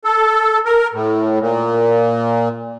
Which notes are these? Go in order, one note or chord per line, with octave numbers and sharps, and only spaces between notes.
A4
A#4
A2
A#2